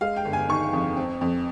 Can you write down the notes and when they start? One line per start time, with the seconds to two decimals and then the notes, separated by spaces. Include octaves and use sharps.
0.01 G#3 F5
0.16 G5
0.25 G1
0.33 G#5
0.49 D#3 C#6
0.73 F2
0.97 C4
1.21 F2